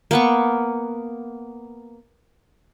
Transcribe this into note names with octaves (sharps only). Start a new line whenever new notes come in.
A#3 B3 C#6